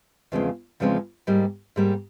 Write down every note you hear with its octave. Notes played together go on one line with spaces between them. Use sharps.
E2 C#3 F3 G#3 C4
E2 C#3 F3 G#3 C4
G#2 G3 A#3
G#2 G3 A#3